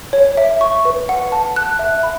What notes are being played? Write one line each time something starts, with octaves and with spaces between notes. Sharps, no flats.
C#5
E5
C#6
B4
F#5
A5
F#6
E5
B5